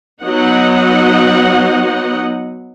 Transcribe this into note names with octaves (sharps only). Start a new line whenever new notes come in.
F#3 B3 D#4 D#5 F#5